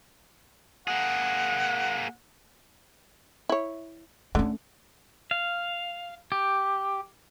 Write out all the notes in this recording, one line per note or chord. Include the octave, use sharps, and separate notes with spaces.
A#3 G#4 F#5
E4 C#5
D3 A3 C#4
F5
G4